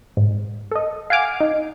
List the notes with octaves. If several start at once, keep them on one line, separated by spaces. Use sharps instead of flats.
G#2
A4 D#5
F5 F#5 G#5 D6 F6
D#4